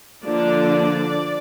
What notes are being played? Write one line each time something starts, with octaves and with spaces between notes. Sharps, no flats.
D3 F3 A#3 D4 D5